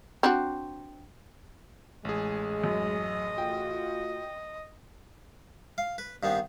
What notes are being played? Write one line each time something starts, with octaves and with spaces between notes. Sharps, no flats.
C4 D4 F#4
A1 G#3 G#4
F#2 D#5
A3 F4 F#4 G5
F5
B4
G2 D#3 B3 C4